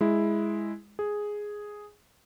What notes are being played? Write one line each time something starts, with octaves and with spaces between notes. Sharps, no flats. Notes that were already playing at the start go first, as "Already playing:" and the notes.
G#3 E4
G#4